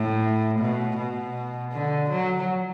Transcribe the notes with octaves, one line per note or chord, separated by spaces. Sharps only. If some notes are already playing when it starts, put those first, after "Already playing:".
Already playing: A2
B2
B2
D3
F#3